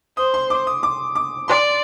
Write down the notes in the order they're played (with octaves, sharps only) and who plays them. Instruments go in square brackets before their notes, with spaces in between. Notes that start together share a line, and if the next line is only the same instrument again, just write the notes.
[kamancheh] C5 [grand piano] D#6
[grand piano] C6
D6
D#6
D6
D6
[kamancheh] D5 [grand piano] C6